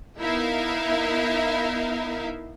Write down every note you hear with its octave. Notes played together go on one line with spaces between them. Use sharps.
B3 D#4 E4 A#4 E5 F5